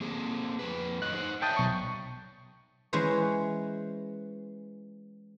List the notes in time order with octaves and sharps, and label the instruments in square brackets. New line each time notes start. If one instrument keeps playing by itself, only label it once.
[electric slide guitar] A#3 C4 G#4
F2 B2 B4
[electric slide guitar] F#2 C#5 D#5 [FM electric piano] F#6
[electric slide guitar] D#4 C5
[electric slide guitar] C#5 D5 E5 [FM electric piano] G5 A5 D#6
[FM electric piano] B1 C#6
[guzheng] E3 G#3 C#4 B4 C5